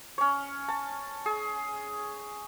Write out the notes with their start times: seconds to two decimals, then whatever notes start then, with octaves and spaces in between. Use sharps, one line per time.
0.18 C#4 C#5
0.68 A5
1.26 G#4